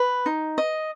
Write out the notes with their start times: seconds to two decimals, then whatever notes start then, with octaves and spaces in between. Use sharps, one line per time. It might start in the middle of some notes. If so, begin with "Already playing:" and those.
Already playing: B4
0.26 D#4
0.58 D#5